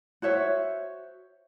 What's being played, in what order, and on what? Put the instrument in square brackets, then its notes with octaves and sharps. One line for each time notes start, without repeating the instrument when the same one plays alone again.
[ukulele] F#4 C5 C#5 E5